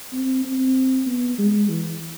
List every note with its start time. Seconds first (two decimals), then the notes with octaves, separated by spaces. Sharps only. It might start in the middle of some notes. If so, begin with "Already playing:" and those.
0.13 C4
0.45 C4
1.07 B3
1.38 G#3
1.69 E3